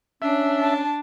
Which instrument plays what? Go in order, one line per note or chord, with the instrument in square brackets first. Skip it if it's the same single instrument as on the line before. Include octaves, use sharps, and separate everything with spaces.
[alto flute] C#4 [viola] D4 [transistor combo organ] E5
[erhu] A5